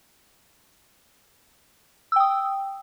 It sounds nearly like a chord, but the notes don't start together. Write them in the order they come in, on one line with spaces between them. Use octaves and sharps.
E6 G5 D#6